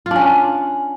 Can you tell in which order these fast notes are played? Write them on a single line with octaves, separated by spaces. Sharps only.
F4 D4 C#4